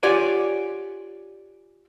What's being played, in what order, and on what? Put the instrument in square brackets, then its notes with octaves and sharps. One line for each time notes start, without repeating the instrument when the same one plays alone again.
[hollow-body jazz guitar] F4 G4 C#5 D5 F#5 G#5